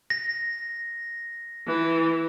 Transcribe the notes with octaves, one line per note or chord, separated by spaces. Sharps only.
A#6
E3